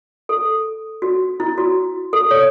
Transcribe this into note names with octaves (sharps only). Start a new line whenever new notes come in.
A4
F#4
E4
F#4
A4
C#5